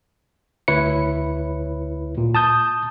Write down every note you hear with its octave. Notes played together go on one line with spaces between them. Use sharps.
D2 E4 B4 C#5 C#7
A#2
A5 D#6 G6